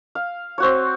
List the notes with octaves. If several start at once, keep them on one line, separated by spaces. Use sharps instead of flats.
F5
C4 F#4 C#5